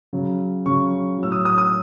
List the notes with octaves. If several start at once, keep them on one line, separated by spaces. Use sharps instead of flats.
C#3 F#3
C#3 F#3 C#6
A2 F#3 E6
D#6
D#6
D#6